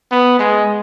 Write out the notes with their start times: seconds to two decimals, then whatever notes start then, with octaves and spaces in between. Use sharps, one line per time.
0.12 B3
0.40 G#3